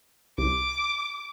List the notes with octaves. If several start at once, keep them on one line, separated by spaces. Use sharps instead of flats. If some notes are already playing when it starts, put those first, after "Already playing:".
C2 D6